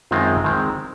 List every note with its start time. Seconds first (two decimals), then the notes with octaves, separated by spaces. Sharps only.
0.11 F#2 D#3 G#3 C4 F4
0.44 D#3 G#3 C4